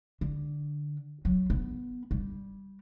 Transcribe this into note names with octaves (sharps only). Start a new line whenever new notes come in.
D3
F#3
B3
G3